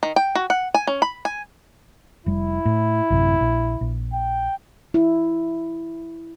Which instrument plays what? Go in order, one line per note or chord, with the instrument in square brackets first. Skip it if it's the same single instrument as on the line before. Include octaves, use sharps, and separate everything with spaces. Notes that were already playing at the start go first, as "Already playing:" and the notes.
[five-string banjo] D#3
G5
F#4
F#5
G#5
C#4
B5
G#5
[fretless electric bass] F1 G3 [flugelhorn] E4
[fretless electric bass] A2
A1 F#2 C3
A#1
A#1
[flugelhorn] G5
[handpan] E4